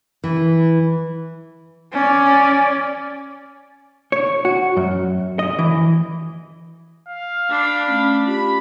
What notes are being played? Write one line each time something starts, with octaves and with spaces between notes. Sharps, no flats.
E3
C#4 D5
C#5
F#4
F#2
D#5
E3
F5
D4 B5
A3 C#4
F4 G4 B5